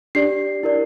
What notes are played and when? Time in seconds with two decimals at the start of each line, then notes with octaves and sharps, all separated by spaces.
0.15 D4 G4 D5 C7
0.63 E4 A#4 D5